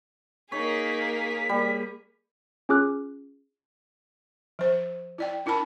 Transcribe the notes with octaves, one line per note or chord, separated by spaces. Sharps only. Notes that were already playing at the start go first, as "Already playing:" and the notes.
A#3 D#4 G#4 C#5 B6
G3 A#3 G#4
C#4 F4 G#4 D6 F6 F#6
F3 C5
E4 D5 G5
D4 E4 A#4 A5 B5